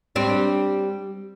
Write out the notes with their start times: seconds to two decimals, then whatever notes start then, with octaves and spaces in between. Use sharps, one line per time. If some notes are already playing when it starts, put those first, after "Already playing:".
0.16 G3 C4 D4